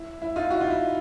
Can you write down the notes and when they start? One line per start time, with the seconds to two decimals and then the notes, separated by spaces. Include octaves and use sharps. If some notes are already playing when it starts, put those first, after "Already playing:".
Already playing: E4
0.22 E4
0.36 D#4 F4
0.50 E4 F#4
0.60 D#4 F4
0.70 E4